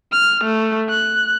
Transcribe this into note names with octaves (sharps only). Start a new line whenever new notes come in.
F6
A3
F#6